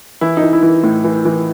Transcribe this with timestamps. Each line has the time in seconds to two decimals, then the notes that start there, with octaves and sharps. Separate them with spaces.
0.21 E3 E4
0.37 D#4
0.43 E3
0.53 E4
0.63 E3
0.83 A2
1.04 E3
1.25 E3